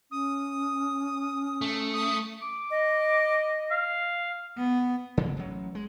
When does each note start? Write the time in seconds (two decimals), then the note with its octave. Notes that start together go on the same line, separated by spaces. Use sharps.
0.11 C#4 D#6
1.61 A3
1.94 D#6
2.42 D6
2.71 D#5
3.71 F5
4.58 B3
5.17 C#3 F#3 A#3
5.37 A1 F#3
5.75 G#3